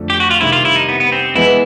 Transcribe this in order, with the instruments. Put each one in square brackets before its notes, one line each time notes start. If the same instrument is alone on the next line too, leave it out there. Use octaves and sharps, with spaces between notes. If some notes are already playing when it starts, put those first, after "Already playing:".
Already playing: [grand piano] F2 D3 F3 A3 D4
[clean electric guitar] G4
F#4
F4
[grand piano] C3 D#3 G3 C4 [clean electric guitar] E4
[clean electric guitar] F4
E4
D#4
B3
B3
C4
[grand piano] E3 G#3 B3 [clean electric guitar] E4